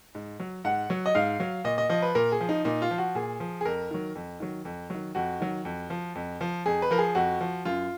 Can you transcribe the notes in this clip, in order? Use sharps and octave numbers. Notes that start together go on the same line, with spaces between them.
G#2
F#3
G#2 F#5
F#3
D#5
G#2 F5
F#3
A#2 D#5
D#5
F3 D#5
B4
A#2 A#4
G#4
F3
D#4
A#2 D#4
F4
F3
F#4
A#2 G#4
F3
G#4
F2 A#4
D#3 F#3
F2
D#3 F#3
F2
D#3 F#3
F2 F#4
D#3 F#3
F2
F3
F2
F3
F2 G#4
B4
F3 A#4
G#4
F2 F#4
F3
F#2 F4